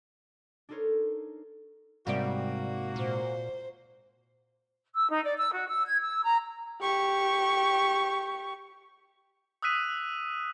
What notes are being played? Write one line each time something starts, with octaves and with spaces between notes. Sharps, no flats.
D4 D#4 A4 A#4 C5 C#5
G#2 C3 G3 A#3 F#4 D5
A#2 C5
E6
D#4
D5
E6
F#4
E6
G#6
E6
A#5
G4 C#6
D#6 E6 F#6 B6 D#7